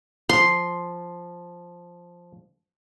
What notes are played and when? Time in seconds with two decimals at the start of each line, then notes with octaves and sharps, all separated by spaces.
0.29 F3 C6